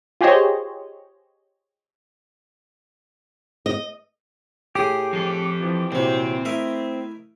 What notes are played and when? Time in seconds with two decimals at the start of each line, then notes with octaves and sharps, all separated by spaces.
0.21 F4 G4 G#4 C5 C#5 D#5
3.66 D#5
4.75 A2 G4 G#4 D#6
5.13 F2 A4 C7
5.60 E3 F3
5.92 C2 A#2 E3 F#3 C4 E4
6.45 A3 E4 A#4 D#5 E5